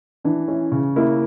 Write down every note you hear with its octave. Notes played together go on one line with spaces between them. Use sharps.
E3 D4
C#4 E4
C#3
A#3 E4